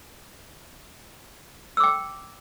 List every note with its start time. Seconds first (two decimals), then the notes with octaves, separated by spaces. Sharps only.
1.77 E6
1.80 D6
1.84 G5